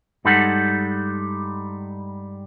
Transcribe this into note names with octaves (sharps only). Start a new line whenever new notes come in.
G2 G3 G#3 D#4 A4 F#5